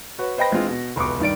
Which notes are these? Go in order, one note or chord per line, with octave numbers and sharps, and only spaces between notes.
F#4 B4 C#5
B4 C5 D#5 G5 B5 A#6
E3 G#3 C4 D4 F4
B2
F1 C#2 B2 C#6 D6
G2 D#3 D5 D7